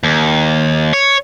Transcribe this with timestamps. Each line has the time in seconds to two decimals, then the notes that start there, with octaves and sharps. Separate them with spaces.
0.03 D#2
0.93 C#5